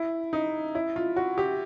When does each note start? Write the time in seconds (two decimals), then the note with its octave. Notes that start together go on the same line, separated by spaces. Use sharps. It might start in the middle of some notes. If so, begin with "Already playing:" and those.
Already playing: E4
0.33 D#4
0.75 E4
0.96 F4
1.16 F#4
1.38 G4